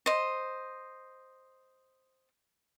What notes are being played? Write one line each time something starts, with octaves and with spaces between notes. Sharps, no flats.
C5 D#5